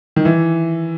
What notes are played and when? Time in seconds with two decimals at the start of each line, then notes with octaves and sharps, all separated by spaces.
0.16 D#3
0.25 E3